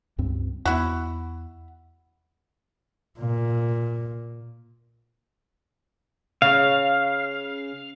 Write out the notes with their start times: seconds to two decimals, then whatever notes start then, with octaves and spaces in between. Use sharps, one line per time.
0.18 C#2 G2 C4
0.65 E2 B3 E4 F#4
3.19 A#2
6.42 C#3 F5